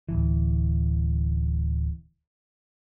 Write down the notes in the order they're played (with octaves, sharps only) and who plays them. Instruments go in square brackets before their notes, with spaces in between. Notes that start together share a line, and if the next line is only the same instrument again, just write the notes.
[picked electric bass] D1 G1 E3